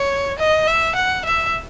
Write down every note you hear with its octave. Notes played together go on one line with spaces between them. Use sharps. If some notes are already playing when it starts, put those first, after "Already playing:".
Already playing: C#5
D#5
E5
F#5
E5